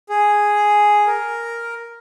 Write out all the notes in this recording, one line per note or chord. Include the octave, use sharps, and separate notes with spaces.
G#4
A#4